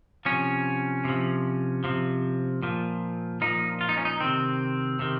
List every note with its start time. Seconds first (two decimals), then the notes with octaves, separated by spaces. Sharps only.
0.25 C3 F3 C#4
1.05 C3 F3
1.84 C3 F3
2.62 A#2 F3
3.41 A#2 F3 D#4
3.81 F4
3.89 D#4
3.97 C#4
4.05 D#4
4.20 C3 D#3 C4
4.99 C3 D#3